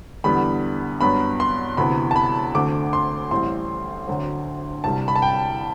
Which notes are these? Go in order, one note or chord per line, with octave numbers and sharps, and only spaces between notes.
E2 D3 G3 B3 B5
G2 F#3 B3 B5
C6
D2 C3 E3 B3 B5
A5
B5
D2 D3 A3 C4 D6
C6
A1 A2 G3 C4 C6
D2 D3 F#3 C4
C2 C3 G3 A5
B5
A5
G5